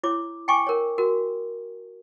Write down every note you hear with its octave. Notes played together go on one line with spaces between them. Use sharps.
E4 C#5 D6
G5 G#5 C#6 D6
A#4 C#5
F#4 A#4